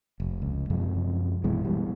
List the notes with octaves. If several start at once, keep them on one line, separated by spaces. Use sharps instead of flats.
F1
C#2
F#2 C3 F3 G#3
A#1 B2 E3 G#3
B2 E3 G3